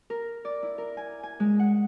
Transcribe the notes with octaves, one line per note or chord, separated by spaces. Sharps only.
A#4
D5
E4
A#4
G#5
G#5
G#3
F#5